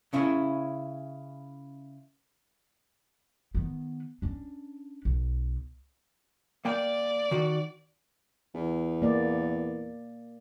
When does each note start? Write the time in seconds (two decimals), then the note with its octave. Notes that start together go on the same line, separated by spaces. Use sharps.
0.13 C#3 C#4 E4
3.55 D#3 B3
4.22 C#4 D4
5.05 B1
6.65 A#3 D5 G5
7.31 D#3 F#4
8.54 E2
9.02 A#3 D5